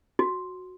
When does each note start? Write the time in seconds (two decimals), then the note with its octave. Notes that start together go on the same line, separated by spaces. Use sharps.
0.19 F#4